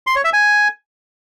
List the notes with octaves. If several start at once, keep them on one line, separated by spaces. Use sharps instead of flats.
C6
C#5
E5
G#5